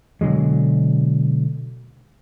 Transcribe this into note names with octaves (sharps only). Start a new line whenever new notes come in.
B2 D3 F#3 G#3